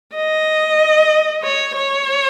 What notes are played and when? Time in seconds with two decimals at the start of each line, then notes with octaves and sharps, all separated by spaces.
0.15 D#5
1.43 C#5
1.76 C#5